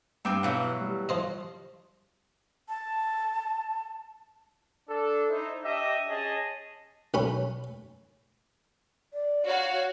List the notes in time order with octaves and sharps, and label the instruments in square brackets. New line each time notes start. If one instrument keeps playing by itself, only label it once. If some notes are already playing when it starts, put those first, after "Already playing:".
[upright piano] G2 D6 [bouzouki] C4 G5 G#5
[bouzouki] B2 E3 F#3 [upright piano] F5
[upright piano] G3
[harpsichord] F3 C5 D#5
[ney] A5
[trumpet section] D4 A4
D#4 E4 C5 E5
D4 G4 D#5 E5
C#4 G#4 D#5 A5
[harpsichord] B1 C#4 B5
[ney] D5
[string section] F#4 F5 [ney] C#5